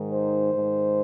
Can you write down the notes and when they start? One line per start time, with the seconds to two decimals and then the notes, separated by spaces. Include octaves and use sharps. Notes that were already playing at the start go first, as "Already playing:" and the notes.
Already playing: G#2 D#3
0.10 C5
0.53 G#2 D#3